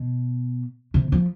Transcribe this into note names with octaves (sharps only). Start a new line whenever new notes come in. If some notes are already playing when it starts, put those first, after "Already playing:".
Already playing: B2
C3
F3